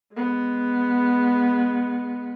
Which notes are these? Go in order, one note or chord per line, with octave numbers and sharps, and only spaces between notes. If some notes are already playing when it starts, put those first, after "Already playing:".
G#3 B3